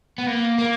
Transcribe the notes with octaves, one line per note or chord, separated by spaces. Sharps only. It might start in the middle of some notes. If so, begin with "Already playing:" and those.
B3
A#3
A#3